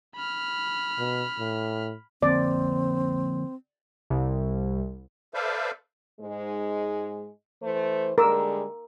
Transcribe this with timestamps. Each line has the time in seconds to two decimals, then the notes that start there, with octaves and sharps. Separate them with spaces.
0.16 B5 F6
0.99 B2
1.39 A2
2.22 D3 F3 A#3 C4 D5
4.10 C2
5.34 A4 B4 C5 D5 E5 F5
6.21 G#2 G#3
7.62 E3 A3 C5
8.18 D3 G3 G#3 A#4 D6 E6